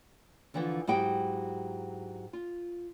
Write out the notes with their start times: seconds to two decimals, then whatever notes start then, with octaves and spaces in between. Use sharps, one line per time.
0.54 D3 E3 F3
0.87 G#2 F#3 E4 G4 G5
2.33 F4